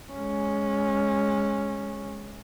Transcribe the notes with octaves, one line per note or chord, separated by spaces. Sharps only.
G#3 C#4